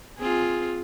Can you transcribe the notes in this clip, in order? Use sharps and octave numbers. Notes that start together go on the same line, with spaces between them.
C4 F4 G#4